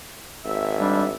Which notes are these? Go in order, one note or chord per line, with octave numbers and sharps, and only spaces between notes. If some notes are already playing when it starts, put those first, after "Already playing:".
G#1 E5
G3 D4